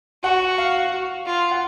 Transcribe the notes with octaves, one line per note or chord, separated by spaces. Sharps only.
F#4 F#5
F5
F4
F#5